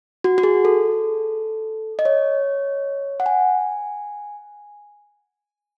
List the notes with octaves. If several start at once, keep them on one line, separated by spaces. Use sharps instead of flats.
F#4
F#4
G#4
A4
D#5
C#5
F#5
G#5